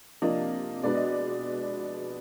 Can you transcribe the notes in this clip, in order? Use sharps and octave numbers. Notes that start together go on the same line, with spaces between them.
C3 F3 A#3 D4 D#5
B2 G#3 B3 D4 D5
D#5